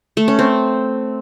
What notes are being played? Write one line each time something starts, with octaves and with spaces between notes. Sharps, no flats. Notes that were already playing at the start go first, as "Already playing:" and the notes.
A3
C#4
C4